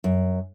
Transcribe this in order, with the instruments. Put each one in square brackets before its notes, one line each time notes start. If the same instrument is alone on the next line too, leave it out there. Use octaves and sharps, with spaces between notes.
[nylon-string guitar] F#2